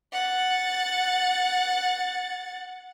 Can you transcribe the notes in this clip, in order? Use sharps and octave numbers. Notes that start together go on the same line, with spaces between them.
F#5 A6